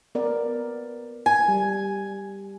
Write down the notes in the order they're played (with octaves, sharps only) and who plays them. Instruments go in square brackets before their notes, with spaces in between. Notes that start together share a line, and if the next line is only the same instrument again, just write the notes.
[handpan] B3 A#4 D5
[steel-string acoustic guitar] G#5
[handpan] G3